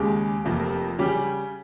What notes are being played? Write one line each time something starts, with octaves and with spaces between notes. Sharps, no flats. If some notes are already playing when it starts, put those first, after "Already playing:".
Already playing: D#2 C#3 G#3 G4
F1 F2 C3 F3 A#3
C#3 G3 C#4 G4